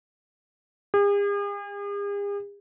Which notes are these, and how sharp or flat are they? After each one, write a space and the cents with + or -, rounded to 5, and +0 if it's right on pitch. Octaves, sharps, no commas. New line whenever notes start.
G#4 -45